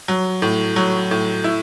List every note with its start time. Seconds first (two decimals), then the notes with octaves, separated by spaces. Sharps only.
0.08 F#3
0.42 A2
0.76 F#3
1.11 A2
1.44 E4